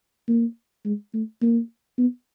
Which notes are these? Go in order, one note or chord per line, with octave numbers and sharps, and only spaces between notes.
A#3
G#3
A3
A#3
B3